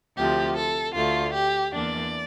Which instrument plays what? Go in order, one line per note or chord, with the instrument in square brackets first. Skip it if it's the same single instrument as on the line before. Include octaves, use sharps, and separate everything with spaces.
[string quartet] D2 C3 F3 G4
A4
D2 D3 A3 F4
G4
E2 E3 A#3 D4 D5